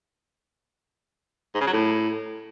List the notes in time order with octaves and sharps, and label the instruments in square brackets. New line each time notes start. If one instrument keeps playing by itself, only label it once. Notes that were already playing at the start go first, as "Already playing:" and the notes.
[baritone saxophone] G#2
C#3
F#3
A2